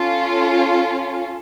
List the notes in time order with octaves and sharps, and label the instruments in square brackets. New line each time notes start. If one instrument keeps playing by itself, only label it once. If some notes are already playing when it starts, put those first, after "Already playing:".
Already playing: [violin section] C#4 F4 A4